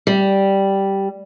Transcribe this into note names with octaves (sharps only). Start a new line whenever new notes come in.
G3